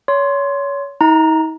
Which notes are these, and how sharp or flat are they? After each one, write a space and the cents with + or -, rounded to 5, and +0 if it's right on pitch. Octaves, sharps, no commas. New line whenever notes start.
C#5 +25 C6 +0
D#4 +45 A#5 +0